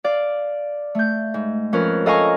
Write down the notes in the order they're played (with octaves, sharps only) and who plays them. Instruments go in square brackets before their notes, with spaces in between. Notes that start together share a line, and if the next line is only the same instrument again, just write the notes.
[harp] D5 F5
A3 G6
G#2
F2 C#4 A#4 B4 F6
A4 D#5 F5 G#5 A#5 C#6